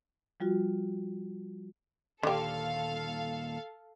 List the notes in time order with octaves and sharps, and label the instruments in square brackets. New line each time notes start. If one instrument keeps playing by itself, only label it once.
[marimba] F3 G3 F4 F#4
[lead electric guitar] D#2 A#2 [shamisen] D3 G4 [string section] A4 F5